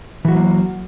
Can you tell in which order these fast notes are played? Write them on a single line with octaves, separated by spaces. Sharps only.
E3 F#4 F#3 A#3